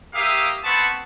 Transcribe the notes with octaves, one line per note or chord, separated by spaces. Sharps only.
A#3 G4 E5 F5 D#6
B3 C4 F#5 A5 B5 C#6